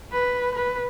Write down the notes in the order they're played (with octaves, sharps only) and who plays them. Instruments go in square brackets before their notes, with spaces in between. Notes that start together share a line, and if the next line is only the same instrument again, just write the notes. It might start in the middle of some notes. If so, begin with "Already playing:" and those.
[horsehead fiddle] B4
B4